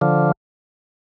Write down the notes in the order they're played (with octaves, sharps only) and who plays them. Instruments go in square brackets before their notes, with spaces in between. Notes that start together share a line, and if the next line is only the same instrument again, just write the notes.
[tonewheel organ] D3 F3